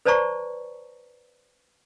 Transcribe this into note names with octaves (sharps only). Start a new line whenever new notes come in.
B4 C5 D5 A5 A#5 C#6